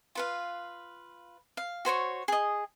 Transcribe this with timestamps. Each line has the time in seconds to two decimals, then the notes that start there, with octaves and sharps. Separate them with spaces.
0.15 F4 B4 F5
1.57 F5
1.85 F#4 C5 C#5 C#6
2.28 G#4 D#5